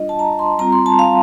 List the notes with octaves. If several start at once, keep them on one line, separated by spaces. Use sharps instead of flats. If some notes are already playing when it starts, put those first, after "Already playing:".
Already playing: G3 D4 F4 D#5
A5
A#5
C6
G3 C4 F4 A#5
C6
A5
F5